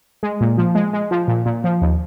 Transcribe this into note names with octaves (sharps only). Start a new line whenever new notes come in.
G#3
A#2
F3
G#3
G#3
F3
A#2
A#2
F3
D#2